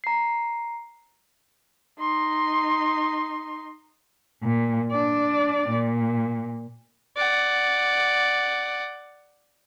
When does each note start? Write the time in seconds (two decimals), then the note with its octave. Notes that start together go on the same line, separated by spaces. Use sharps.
0.04 A#5 C7
2.00 D#4 C6
4.43 A#2
4.91 D4 D5
5.69 A#2
7.17 D5 F#5